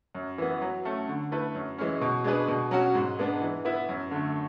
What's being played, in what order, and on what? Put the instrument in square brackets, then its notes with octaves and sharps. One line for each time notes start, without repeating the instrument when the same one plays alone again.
[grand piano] F#2
E3 B3
F#3
A3 C#4
D3
A3 E4 B4
F#2
E3 G#3 C#4
B2
G#3 D4 G#4 B4
B2
F#3 C#4 F#4
G#2
G#3 B3 D4
E3
B3 E4
F#2
D3 A3